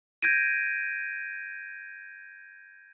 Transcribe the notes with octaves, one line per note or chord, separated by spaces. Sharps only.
G6 G#6 A#6 D7 D#7